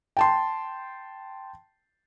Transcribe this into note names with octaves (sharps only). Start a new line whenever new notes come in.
G5 A5 C6